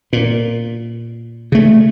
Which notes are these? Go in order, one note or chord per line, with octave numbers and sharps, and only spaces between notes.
A#2
C#3 A3